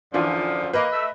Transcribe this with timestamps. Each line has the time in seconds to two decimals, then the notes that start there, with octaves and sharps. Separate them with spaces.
0.14 F#2 D3 E3 F3 D4 F4
0.73 A#3 B4 D#5
0.92 A3 E5